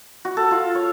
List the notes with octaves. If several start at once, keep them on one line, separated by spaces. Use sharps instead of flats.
F#4
A4
F4
C#5